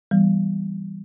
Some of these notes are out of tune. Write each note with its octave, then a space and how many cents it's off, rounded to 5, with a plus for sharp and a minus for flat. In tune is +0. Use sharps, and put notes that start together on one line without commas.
E3 +0 G3 +0 B3 -10